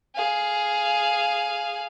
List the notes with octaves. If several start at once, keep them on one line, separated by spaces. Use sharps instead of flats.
G#4 F5